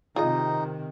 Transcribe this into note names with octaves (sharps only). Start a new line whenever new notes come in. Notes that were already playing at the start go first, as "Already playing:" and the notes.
C3 D#3 D#4 F4 G#4 D#5